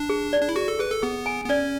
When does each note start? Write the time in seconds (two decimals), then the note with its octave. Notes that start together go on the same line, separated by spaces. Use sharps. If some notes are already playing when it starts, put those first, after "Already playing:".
Already playing: D4
0.10 G#4
0.33 D5
0.41 D4
0.49 E4
0.56 F#4 G#4
0.68 A4
0.79 G#4 B4
0.91 A4
1.02 B3 G#4
1.26 G#5
1.44 B3
1.49 C#4 D5